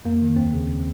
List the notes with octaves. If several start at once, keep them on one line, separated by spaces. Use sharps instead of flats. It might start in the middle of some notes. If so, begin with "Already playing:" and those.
F2 A#3
D#3
D#2 C4
C#3